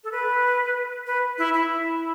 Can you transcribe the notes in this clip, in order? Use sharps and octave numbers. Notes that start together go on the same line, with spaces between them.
A4
B4
B4
E4
E4